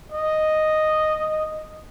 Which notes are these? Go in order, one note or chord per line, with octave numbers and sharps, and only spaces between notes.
D#5